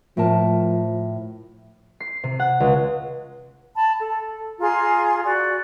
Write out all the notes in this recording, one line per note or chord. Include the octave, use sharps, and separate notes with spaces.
A2 F3 A#4 A5
C7
C3
F#5
C#2
A5 B5
A4
F4 G#4 A#5 C6
F#4 D5